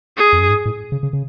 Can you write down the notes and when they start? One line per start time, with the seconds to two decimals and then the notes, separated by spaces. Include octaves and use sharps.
0.17 G#4
0.33 F2
0.40 F#2
0.49 G#2
0.65 A2
0.92 C#3
1.03 C#3
1.13 C#3